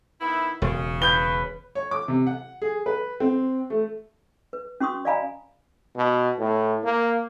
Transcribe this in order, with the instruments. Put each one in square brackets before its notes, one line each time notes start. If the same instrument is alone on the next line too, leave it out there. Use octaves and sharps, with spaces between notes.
[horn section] D#3 B3 E4
[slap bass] E1 [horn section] C#3
[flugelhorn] B4 [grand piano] G6 G7
[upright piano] C#5
D6
C3
F#5
G#4
B4
C4
A3
[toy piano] B4
C#4 F#4 C6 C#6 D#6
D5 D#5 F5 G#5 A#5 B5
[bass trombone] B2
A2
A#3